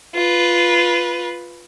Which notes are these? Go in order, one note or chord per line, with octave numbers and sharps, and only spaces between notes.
F4 B4